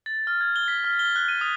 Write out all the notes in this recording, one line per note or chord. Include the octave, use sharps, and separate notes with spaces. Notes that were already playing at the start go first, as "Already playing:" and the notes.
A6
F6
G#6
G7
B6
F6
G7
F#6
D#7
D#6